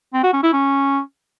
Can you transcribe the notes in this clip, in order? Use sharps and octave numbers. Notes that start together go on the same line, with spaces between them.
C4
F#4
C#4
E4
C#4